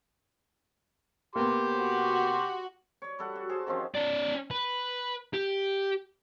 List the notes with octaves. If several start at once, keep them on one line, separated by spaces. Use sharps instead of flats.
A#3 B3 G4 C6 D6
F#4
C#5 D5
G3 A4 F#5
F#4
F#4 G#4 C5 A5
D#3 F3 C4 C#4
C#4 D5
B4
G4